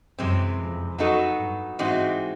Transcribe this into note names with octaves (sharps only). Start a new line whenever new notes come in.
F#2 C3 E3 G#3 C4
F2
F#3 B3 D#4 F#4 A4
G2
G#2 E3 G#3 C4 D#4 F#4